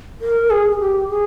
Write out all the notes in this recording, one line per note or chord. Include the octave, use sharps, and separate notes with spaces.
A#4
G#4
G#4
G4
G#4